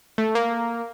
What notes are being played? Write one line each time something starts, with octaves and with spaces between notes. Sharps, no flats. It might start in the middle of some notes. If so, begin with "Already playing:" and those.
A3
A#3